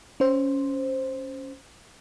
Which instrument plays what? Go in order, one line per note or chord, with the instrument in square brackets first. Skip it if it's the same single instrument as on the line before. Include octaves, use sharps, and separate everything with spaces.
[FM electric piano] C#4 C5